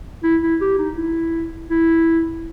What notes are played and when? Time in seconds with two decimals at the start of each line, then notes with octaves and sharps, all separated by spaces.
0.23 E4
0.42 E4
0.61 G4
0.78 D#4
0.97 E4
1.70 E4